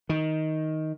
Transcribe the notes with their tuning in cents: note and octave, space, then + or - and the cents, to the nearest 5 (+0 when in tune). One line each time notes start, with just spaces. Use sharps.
D#3 +10